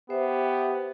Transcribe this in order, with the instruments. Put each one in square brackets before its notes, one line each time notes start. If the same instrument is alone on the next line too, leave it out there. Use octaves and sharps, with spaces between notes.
[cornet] B3 [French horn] G4 [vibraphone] C5 E5